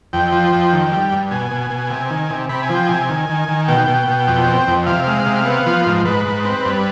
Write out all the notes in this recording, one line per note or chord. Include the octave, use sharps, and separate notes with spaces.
F2 G5
F3
F2
D#3
G3
G2
B2 G#5
B2
B2
C3
D#3
C3
C3 B5
G#5
F3
G5
C3 G#5
D#3
D#3
D#3
B2 G5
B2
B2
F2
C4
F2
C3 F5
G#3
C3
B3
F3
G#2
G#2 B4
G#2
C4
G2